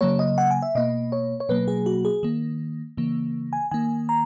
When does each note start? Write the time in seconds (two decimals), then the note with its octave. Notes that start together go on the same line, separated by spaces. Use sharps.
0.01 C#3 F#3 A#3 C#5
0.19 D#5
0.38 F#5
0.51 G#5
0.63 E5
0.75 B2 A#3 D#5
1.12 C#5
1.40 C#5
1.49 B2 F#3 A#3 B4
1.68 G#4
1.86 F#4
2.05 G#4
2.23 D#3 A#3
2.97 C#3 E3 A#3
3.53 G#5
3.71 D#3 A#3 G#5
4.09 A#5